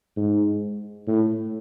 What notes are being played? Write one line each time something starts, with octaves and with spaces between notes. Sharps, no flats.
G#2
A2